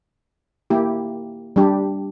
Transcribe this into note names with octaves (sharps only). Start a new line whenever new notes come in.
A#3 E4 G4
G3 D4 G4